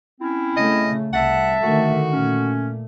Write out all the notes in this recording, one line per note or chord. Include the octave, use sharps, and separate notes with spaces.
C4 C#4 E4
C#3 A3 D#5
C2 E5 F#5 A5
D3 D#3 A3 F#4
A#2 A3 C#4